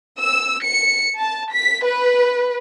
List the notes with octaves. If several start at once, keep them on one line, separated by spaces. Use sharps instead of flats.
E6
C#7
A5
B6
B4